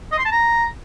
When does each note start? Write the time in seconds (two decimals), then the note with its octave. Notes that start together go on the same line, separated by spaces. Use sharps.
0.12 D#5
0.19 C6
0.25 A5
0.32 A#5